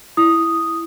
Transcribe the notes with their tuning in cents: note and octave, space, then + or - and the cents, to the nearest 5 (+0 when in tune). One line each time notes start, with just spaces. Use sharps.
E4 +0 D#6 +0